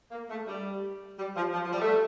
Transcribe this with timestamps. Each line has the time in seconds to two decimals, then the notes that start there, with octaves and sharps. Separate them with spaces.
0.11 A#3
0.30 A3
0.47 G3
1.18 G3
1.36 F3
1.54 F3
1.64 F3
1.73 G3
1.82 A3